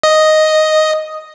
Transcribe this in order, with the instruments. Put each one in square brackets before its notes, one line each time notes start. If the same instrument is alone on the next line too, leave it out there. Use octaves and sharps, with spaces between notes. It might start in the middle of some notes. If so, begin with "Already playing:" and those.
[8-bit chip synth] D#5